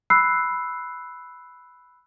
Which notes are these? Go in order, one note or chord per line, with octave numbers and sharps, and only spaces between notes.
B5 E6 F#6 C7